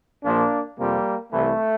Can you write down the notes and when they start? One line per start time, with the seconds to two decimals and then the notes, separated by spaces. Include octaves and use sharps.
0.24 A#1 A#2 F3 A#3 D4
0.78 F2 C3 F3 G3 A#3
1.32 C2 C3 E3 A3